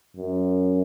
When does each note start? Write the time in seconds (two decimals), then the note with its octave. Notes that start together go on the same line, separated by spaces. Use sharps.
0.17 F#2